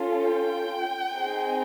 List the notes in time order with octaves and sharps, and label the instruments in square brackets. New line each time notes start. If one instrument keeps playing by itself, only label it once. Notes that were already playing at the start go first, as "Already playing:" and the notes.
Already playing: [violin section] C#4 F4 A4
G5
C4 D#4 G#4